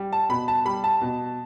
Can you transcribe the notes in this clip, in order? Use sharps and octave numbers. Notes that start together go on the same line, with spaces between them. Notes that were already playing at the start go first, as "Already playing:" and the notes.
Already playing: G3
A5
B2 B5
A5
G3 B5
A5
B2